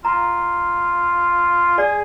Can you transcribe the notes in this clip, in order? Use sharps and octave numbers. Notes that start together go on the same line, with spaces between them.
F4 A#5
G#4 D5